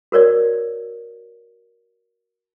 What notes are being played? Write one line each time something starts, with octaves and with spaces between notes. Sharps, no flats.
F#4 A#4 C#5 D5